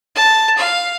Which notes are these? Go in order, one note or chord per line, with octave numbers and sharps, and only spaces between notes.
A5
F5